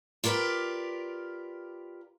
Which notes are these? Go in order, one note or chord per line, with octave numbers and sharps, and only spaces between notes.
F4 G4 A#4 B4 D5